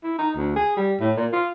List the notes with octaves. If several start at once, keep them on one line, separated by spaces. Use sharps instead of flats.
E4
D#4
D2
G#4
G3
A2
A#2
F4